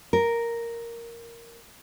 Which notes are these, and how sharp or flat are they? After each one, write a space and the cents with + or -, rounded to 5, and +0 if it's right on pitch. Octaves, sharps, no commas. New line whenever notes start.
A#4 +0